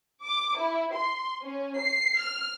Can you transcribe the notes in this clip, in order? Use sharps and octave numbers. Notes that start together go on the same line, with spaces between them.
D6
E4
C6
C#4
C7
F6